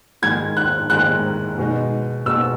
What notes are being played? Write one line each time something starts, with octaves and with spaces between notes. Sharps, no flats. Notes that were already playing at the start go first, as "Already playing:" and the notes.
G#2 D#3 G#3 G#6
F#6
G#2 D#3 G#3 F#6
B2 G#3 D#4
B2 G#3 D#4 E6